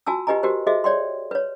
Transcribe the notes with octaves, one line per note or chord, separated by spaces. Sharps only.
F4 F#4 G#5 A5 E6
F4 G4 B4 D#5 G#5 A#5
F#4 G4 A#4 C5
F#4 G#4 C5 D#5 E5
C#5 D5 G5 C6
B4 C#5